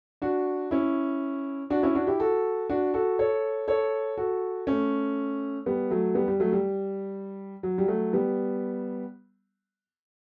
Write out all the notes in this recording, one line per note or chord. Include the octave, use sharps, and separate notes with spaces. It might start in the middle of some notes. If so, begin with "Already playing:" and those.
D4 F#4
C#4 E4
D4 F#4
C#4 E4
D4 F#4
E4 G4
F#4 A4
D4 F#4
F#4 A4
A4 C#5
A4 C#5
F#4 A4
A3 C#4
G3 B3
F#3 A3
G3 B3
G3
F#3 A3
G3
F#3
G3
F#3 A3
G3 B3